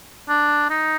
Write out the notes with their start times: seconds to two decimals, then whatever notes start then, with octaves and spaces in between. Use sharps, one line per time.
0.29 D4
0.70 D#4